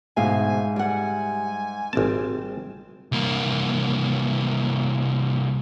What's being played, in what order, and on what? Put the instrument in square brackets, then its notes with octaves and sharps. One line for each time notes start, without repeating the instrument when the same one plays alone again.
[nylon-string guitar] D2 B2 F5 [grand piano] G#2 E5 [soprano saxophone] G#5
[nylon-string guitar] G3 F#5 [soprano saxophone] G#5
[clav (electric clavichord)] G#1 A5 [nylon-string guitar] G3 C4
[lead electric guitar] C2 A#3